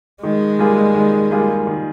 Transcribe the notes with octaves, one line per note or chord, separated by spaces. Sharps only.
D#3 G#3
G3 A#3 F4 G#4
D#3
G3 A#3 F4 G#4
D#3